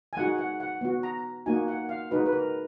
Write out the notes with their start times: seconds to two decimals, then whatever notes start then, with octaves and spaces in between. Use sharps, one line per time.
0.13 G#5
0.17 G#3 D#4 F#4 F#5
0.38 F#5
0.60 F#5
0.81 B3 F#4
1.03 A#5
1.46 A#3 D#4 F#4 G#5
1.68 F#5
1.89 F5
2.11 G#3 D#4 F#4 B4
2.26 B4
2.33 A#4